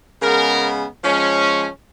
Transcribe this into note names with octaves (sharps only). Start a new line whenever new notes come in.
C#3 G#3 B3 A#4
F3 G#3 C#4